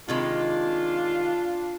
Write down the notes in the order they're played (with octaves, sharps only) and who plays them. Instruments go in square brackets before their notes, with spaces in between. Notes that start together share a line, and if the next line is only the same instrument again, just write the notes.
[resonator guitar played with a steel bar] C3 D#3 G#3 [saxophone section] D4 F4